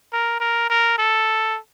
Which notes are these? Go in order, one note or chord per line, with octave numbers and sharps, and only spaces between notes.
A#4
A#4
A#4
A4